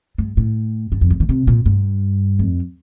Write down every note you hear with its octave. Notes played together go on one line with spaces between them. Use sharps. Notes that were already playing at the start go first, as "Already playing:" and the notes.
G2
A2
G2
F2
G2
D#3
C3
A#2
G2
F2